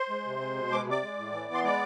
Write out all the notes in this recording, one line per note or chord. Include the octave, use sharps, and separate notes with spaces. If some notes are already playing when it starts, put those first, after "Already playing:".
Already playing: C5 C6
G#3
C3
G#3
B2
G#3 D6
C3 D5 D6
G#3
A2
E3
B3
C6
G#3 D5 D6